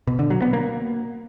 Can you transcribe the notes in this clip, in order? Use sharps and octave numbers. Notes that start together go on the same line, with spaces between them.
B2
D3
F#3
B3
A#3